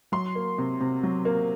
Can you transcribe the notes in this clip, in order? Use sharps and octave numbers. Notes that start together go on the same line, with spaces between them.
F#3 C6
A#3
C3
C3
F#3
A#3